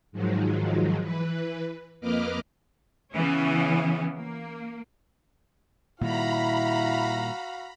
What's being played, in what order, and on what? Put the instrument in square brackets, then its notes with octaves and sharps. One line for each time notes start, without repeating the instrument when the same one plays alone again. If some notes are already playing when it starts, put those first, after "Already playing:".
[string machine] G#2 D#3 F3 F#3 G#3
E3 B4
F2 A#3 B4 D#5 D6 F6
[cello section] C#3 E3 B3 C#4
A#3
[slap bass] A#2 D#3 G3 [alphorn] E4 [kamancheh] F#4 F5 [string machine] A#5 B5